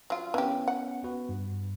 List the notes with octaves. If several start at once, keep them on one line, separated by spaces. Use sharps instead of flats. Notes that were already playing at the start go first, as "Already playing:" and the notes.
F#3 F4
E3 B3 C#4 G4
F#5
B3 F#4 B4
G2